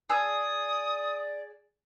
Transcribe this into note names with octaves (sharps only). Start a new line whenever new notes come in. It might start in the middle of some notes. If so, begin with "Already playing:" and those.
G#4 D5 D#6 E6